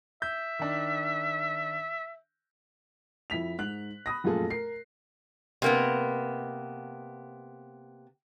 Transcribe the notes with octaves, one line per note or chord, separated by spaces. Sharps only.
E5 G6
D#3 D4
F2 E4 B6 F7
G#2 F#6 F#7
B5 D#6 A#6
F1 F#2 A#2 F4 G#4 A4
A#4 C7
C3 A#3 B3